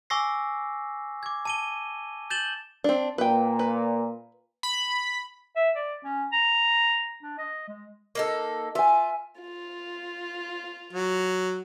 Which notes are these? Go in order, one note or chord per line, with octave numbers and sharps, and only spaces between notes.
G#5 C#6 D6 E6 A#6 C7
D6 G#6
A5 D#7 G7
G6 A6 E7 F#7 G7
C4 D4
A#2 B4 G5
B4
B5
E5
D5
C#4
A#5
D4
D#5
G#3
A#3 D#4 A4
F4 E5 G#5
F4
F#3